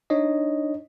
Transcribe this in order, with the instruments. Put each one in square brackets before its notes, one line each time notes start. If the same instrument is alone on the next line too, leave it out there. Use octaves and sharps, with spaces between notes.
[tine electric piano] D4 D#4 C#5 D#5